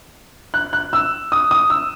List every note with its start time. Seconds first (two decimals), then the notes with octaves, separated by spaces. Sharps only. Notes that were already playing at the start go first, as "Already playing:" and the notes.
0.54 F#6
0.73 F#6
0.93 E6
1.32 D#6
1.51 D#6
1.70 E6